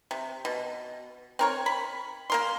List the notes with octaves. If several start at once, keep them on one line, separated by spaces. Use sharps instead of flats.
C3
B2
C4 A#4 C#5
B5
A#3 A#4 C6